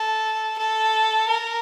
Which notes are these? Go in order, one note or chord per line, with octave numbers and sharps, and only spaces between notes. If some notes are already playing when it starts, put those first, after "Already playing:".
Already playing: A4
A4
A#4